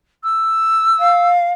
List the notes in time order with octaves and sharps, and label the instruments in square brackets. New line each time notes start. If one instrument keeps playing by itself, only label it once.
[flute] E6
[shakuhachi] F5